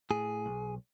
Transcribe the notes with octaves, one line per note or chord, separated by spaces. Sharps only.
A2 G#4
B1